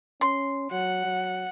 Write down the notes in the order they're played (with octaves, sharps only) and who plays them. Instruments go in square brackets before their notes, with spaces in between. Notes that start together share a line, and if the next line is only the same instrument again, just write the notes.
[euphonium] C#4 [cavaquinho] C6
[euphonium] F#3 [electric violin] F#5
[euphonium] F#3